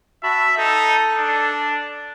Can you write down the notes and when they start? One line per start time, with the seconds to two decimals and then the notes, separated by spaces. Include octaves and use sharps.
0.23 F#4 E5 A5 B5
0.57 D#4 A4
1.18 D4